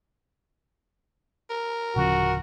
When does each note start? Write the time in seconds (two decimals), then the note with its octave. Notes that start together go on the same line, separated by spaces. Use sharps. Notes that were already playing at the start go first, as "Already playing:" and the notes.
1.50 A#4
1.96 D1 C#3 F3 F#4